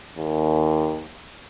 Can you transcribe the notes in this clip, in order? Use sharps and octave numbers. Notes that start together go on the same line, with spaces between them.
D#2